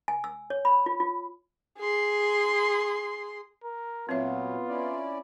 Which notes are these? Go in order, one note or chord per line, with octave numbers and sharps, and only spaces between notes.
G#5
E6
C#5
B5
F4
F4
G#4 C6
A#4
A#2 F#3 B3 C4 F4 C#5 E5
C#4 E4 D5